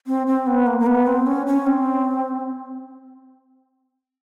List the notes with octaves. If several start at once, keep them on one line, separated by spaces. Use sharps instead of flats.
C4
C4
B3
A#3
A#3
B3
C4
C#4
C#4
C4